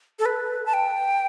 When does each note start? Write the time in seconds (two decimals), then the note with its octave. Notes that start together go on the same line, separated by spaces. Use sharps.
0.19 A4
0.26 B4
0.66 A5
0.74 G5